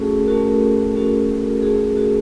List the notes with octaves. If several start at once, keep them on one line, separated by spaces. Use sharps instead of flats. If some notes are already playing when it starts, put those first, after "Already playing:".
Already playing: A3 C#4 F#4 G#4 A4
A#4
A3 C#4 F#4 A4
A3 C#4 F#4
A3 C#4 F#4 G#4
F#4